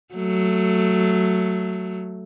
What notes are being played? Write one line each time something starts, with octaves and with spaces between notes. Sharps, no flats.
F#3 A3